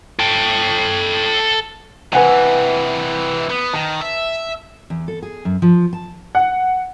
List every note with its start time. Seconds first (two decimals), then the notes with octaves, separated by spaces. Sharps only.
0.19 A4 G5
2.13 C3 E3 B4 F#5 G#5
3.50 B3
3.73 D#3 A5
4.01 E5
4.90 E2
5.08 A4
5.22 G#4
5.45 F#2
5.62 F3
5.93 A5
6.35 F#5